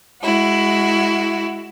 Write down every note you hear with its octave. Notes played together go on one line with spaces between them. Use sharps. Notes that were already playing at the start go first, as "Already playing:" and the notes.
G#3 E4 F#4